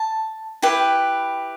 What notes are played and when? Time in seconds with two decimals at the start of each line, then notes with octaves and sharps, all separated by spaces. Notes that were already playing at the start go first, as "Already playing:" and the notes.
Already playing: A5
0.62 E4 G4 B4 G5